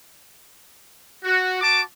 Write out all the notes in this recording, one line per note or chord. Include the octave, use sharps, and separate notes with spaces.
F#4
F#4 A5 D6